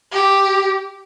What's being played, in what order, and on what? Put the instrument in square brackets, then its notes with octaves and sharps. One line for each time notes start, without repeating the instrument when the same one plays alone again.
[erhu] G4